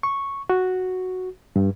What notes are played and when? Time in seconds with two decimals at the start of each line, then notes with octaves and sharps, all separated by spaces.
0.03 C#6
0.50 F#4
1.56 G2